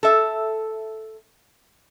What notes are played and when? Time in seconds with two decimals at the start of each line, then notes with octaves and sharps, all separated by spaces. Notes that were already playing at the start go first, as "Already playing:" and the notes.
0.03 A4 E5